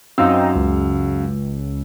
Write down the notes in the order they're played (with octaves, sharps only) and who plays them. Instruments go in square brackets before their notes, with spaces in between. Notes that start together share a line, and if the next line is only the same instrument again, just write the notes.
[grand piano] F#2 F5 E6 [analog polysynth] C4 D#4
[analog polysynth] C#2